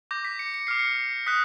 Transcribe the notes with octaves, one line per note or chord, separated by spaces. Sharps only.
D6 G6 A#6
B6
C#7
C#7
D6 F6 C7
C#7
D#6 F#6 B6